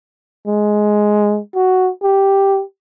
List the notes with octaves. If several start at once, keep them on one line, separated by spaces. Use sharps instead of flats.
G#3
F#4
G4